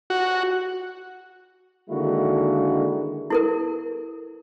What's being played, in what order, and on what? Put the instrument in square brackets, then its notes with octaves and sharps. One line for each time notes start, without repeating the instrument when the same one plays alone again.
[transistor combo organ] F#4
[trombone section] D3 D#3 G#3 A#3 E4 F#4
[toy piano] E4 A4 A#4